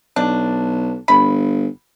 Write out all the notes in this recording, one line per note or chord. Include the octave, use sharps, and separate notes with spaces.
B1 D4
G1 B5